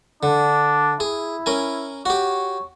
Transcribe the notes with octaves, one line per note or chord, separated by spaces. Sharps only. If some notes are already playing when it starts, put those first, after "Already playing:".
D3 D4
E4 G#4
C#4 A#4 G#5
F#4 G4 C#5